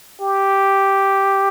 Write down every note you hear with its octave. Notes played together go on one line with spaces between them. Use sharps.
G4